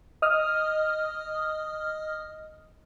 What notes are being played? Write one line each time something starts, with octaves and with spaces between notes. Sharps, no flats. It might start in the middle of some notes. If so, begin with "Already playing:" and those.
D#5 D#6 F6